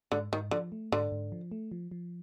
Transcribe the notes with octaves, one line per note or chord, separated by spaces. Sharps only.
G#2 D3
G#2 D#3
D3 F3
A3
G#2 D3
G#2
F3
A3
F3
F3